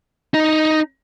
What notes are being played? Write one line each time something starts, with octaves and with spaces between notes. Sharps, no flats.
D#4